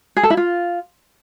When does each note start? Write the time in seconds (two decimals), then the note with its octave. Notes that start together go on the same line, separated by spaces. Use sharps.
0.17 G#4
0.23 A4
0.30 E4
0.37 F4